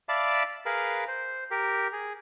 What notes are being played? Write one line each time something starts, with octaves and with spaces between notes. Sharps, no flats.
D5 E5 F5 A5 B5 D6
G#4 A#4 B4 F5 B5
C5
G4 A#4
G#4